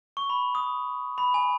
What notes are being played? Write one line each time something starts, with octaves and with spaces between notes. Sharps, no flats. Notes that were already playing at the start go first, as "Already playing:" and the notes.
C#6
B5
D#6
B5
G#5